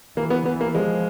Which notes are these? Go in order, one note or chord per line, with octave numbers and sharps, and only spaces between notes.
E3 A#3
B3
E3 B3
A#3
F3 G#3